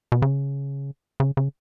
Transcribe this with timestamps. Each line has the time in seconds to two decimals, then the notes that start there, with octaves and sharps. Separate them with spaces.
0.12 B2
0.22 C#3
1.20 C#3
1.37 C#3